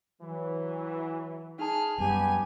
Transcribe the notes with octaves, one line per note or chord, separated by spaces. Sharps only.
E3 F#3
D#4 G#4 A5 F6
F#2 F3 G3 B3 G4 G#5